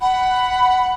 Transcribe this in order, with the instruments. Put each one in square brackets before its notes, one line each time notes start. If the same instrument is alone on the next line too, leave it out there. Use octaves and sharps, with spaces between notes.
[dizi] F#5 [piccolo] B5